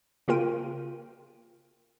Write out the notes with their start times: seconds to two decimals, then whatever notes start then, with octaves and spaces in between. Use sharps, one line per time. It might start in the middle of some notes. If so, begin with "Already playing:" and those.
0.28 C#3 A#3 F4 A#4 G5 D#7